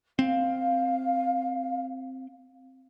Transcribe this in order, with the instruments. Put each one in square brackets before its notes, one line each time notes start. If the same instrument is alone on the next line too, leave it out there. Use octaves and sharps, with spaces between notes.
[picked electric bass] C4 [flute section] F5